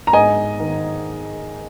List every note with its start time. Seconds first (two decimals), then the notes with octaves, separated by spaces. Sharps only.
0.07 A#5
0.13 G#2 D#5 G#5
0.60 D#3